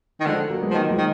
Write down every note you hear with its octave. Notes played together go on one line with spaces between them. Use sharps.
D#3
D3 F3 G#3
F#3 A#3
G#3 B3
F3
D#3 F#3 A#3
F3 G#3
D#3